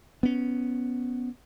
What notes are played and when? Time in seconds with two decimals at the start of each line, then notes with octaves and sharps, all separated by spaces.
0.23 B3 C#4